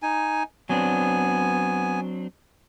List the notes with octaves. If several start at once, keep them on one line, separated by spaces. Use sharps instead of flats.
D#4 G#5
F#3 B3 C4 D4 G#5